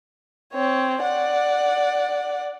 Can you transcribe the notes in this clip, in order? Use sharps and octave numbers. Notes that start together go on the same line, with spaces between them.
C4 C#5
D5 F#5